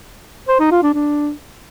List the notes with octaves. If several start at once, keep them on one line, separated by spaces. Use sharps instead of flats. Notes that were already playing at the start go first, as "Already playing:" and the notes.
C5
D#4
F4
D4
D4